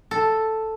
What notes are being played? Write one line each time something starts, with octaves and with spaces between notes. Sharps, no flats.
A4